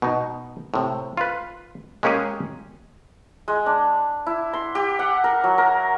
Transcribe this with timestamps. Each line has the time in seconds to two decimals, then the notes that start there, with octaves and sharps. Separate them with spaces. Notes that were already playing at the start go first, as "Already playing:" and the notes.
0.02 B2 D#4
0.74 A2 C3
1.17 F4 B4
2.03 G#3 A#3 C#4 G4 G#4
3.48 G#3
3.66 D4
4.26 E4
4.53 C6
4.75 G4
4.99 F#5
5.24 A#4
5.44 F#3
5.58 A#4